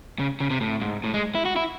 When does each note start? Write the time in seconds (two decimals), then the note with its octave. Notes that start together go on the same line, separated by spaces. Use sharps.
0.19 C#3
0.40 C#3
0.50 C3
0.61 A2
0.82 G#2
1.04 A2
1.14 G#3
1.35 E4
1.45 F#4
1.56 E4